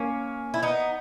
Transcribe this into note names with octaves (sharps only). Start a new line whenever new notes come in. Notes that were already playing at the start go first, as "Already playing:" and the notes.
Already playing: A#3 C#4
E4
B3 D#4